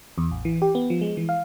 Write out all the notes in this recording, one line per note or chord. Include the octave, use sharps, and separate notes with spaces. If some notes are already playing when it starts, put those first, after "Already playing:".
E2
A1
E3
G4
B3
F3
G#3
E3
F5